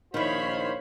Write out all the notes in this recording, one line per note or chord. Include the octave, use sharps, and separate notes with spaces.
A#1 D#3 E4 F4 C5 C#5 B5